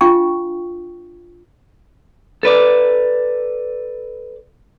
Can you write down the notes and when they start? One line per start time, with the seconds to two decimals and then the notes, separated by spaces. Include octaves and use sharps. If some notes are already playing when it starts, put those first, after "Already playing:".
0.01 D4 F4 F5 G5 C#6
2.43 A4 B4 D5